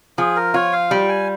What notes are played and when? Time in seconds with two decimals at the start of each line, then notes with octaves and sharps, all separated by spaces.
0.18 F3 G#4
0.36 A#4
0.54 F4 C#5
0.73 F5
0.91 G3 G5
1.09 G#5